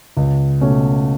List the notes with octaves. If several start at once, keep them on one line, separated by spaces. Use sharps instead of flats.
C#2
B2 A3 C#4